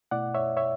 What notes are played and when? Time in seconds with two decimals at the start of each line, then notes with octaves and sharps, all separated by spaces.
0.11 B2 A3 E4 D5 F#5
0.34 C#5 E5
0.57 C#5 E5